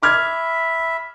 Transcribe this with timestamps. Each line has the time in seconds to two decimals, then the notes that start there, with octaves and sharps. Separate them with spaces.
0.03 E5 B5 D6 F6 G#6